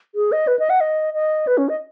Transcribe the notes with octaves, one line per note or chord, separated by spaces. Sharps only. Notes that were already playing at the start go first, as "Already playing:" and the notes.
G#4
D#5
B4
D#5
F#5
D#5
D#5
B4
C#4
D#5